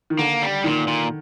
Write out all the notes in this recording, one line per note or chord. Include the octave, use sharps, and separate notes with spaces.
D#3
D3 A#3
G3
A#2 D#3
A#2